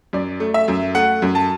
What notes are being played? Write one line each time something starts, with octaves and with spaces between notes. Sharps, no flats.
F#2 D5
A3
E5
F#2
A3 F#5
F#2
A5